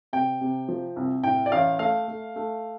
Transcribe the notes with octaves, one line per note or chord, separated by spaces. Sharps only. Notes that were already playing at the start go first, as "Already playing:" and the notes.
C3 G5
C3
F3
C2
A2 G5
D5
A1 F5
A3 F5
A3
A3